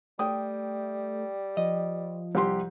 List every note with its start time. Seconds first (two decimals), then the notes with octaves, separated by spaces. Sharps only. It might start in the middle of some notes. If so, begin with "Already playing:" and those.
0.19 G3 A3 G5 D#6
1.57 F3 D#5
2.35 C2 G4 C6